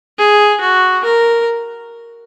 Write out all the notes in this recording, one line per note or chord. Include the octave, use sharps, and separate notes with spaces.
G#4
F#4
A#4